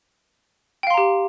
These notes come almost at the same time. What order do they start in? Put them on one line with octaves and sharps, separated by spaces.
G5 F5 C6 A#5 G4